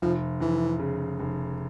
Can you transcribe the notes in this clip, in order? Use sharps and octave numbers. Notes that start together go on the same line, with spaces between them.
F1 F3
F1 E3
C#3
F1